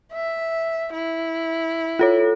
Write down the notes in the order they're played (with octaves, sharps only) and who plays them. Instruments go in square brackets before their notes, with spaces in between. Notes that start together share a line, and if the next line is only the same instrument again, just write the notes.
[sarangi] E5
E4
[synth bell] F4 A4 C#5